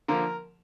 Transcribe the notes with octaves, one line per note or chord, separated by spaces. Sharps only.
D3 F3 A#3 A#4